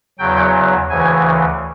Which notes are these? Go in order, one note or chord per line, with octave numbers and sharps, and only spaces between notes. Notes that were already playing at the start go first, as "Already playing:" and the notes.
E2 C#3 F#3 G5
D2 C#3 E3 G#5